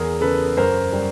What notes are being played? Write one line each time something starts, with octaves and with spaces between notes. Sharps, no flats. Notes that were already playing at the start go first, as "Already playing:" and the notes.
Already playing: E2 G#4 A#4
C#3 A4 B4
F#2 A#4 C5
G3